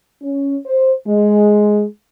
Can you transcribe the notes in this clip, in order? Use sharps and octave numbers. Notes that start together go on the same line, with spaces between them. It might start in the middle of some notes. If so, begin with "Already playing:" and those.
C#4
C5
G#3